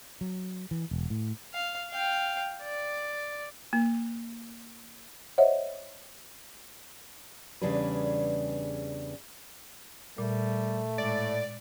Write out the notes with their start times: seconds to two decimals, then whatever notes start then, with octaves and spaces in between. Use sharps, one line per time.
0.21 F#3
0.71 E3
0.91 E1
1.10 A2
1.53 F5
1.90 F5 G5
2.63 D5
3.73 A#3
5.38 C5 C#5 D#5 E5 F#5
7.62 E2 C#3 G3 D4 G#4 B4
10.18 A#2 G3 A3
10.98 A2 G#3 D5